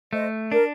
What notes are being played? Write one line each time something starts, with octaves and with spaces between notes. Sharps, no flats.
A3 C5 D#5
D4 A#4 D5